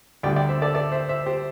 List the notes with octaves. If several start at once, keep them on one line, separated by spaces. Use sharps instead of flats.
D2 D3 G3 D5 G5
D5 G5
C5 E5
A4 D5
A4 D5
C5 E5
C5 E5
G4 C5